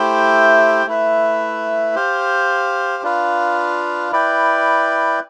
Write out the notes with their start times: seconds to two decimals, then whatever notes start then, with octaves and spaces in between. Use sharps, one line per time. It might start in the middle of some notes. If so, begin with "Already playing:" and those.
Already playing: A3 E4 G4 C5 G5
0.86 A3 E4 B4 E5
1.95 G4 C5 F5
3.03 D4 F4 B4 F5
4.12 E4 B4 D5 G5